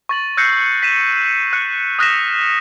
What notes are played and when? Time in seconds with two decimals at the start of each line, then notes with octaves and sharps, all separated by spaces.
0.09 C#6 A6 F#7
0.37 E6 F#6 G6 A#6 C7 C#7
0.83 B6 D#7 E7
1.53 F#6 C#7
1.99 D#6 F6 F#6 A#6 B6 E7